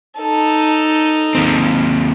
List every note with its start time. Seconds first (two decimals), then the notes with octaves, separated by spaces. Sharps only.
0.19 D#4 A4
1.35 D#2 C4